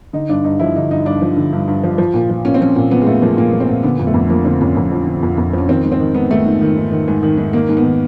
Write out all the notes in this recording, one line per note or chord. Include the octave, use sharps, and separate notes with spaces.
D3 D#4
G2 D4
G2 D#4
F3 E4
D3 D#4
G2 D#4
G2 D4
F3
D3
G2
G2
F3
F3
A#2
F3
A#2 C#4
C4
F3 C#4
A#2
F3 B3
G#3
A#2 A3
F3 A#3
A#2 A#3
F3
C4
A#2
D3 B3
F2
A3
F2
F3 A#3
D3 C4
F2 C#4
F2
F3
D3
F2
F2
F3 C#4
D#3 C4
G#2
C4
D#3
G#2 B3
D#3 A3
G#2
D#3
G#2
D#3
G#2
D#3
G#2
D#3 A#3
G#2
B3
D#3